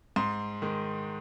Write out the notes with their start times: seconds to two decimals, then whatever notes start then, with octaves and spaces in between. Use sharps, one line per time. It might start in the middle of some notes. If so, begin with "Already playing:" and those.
0.16 G#2 C6
0.62 D#3 G#3